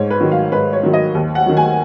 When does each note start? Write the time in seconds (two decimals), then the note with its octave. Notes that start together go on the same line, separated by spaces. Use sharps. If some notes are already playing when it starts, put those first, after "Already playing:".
Already playing: G#2 C#5
0.10 B4
0.21 D#3 F#3
0.32 F5
0.52 G#2 B4
0.73 C#5
0.83 D#3 F#3
0.93 D#5
1.14 D#2
1.35 F#5
1.46 D#3 F#3
1.57 G#5